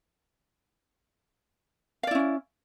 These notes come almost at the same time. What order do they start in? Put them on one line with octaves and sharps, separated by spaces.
F5 D5 E4 C#4